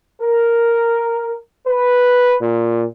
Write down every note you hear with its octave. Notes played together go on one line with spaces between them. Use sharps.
A#4
B4
A#2